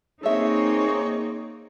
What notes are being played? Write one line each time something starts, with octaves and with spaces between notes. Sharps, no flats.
A#3 C4 D#4 G#4 A4 C#5 E5